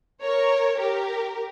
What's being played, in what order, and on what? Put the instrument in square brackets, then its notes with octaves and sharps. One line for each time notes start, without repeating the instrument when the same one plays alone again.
[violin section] A#4 C#5
G4 A#4